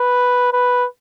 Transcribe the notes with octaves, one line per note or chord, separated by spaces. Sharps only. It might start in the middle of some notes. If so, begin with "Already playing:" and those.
Already playing: B4
B4